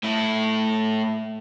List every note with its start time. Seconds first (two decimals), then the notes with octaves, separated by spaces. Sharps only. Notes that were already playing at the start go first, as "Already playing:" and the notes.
0.03 A2 E4